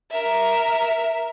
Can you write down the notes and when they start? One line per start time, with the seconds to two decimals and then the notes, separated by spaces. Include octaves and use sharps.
0.11 A#4 E5